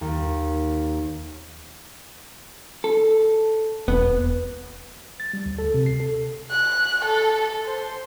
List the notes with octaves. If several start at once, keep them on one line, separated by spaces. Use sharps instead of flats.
D#2
A4
E1 B3
A6
G3
D2
A4
C3
C7
A4
F#6
A4
C5